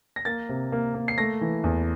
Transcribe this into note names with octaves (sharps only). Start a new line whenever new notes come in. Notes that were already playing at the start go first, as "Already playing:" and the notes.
A#6
A#3 A6
C3
A#3
A#3
C7
A3 A#6
E3
E2